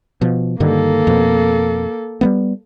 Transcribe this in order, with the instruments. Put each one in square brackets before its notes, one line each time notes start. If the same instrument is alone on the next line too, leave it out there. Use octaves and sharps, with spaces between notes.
[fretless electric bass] B2 F3
[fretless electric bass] G2 D3 D#3 [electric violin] A#3 A4
[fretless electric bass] F2 B2
G3 A3 B3